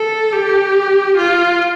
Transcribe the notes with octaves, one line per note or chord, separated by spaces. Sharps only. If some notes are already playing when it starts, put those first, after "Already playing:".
Already playing: A4
G4
F4